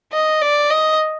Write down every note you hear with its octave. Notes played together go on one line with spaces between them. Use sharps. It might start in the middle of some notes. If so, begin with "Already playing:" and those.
D#5
D5
D#5